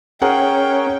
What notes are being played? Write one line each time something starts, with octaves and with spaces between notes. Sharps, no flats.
C#4 G#4 A#4 F#5 G5